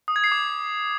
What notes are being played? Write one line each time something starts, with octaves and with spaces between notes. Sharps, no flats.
D#6
G#6
C7
D6